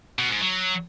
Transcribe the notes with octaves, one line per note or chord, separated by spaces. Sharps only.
B2
G#2
F#3